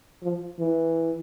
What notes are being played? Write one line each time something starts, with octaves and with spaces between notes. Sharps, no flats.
F3
E3